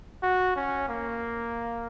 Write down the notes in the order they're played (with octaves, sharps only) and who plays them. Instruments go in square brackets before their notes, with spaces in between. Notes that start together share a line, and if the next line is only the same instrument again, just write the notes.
[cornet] F#4
C#4
A#3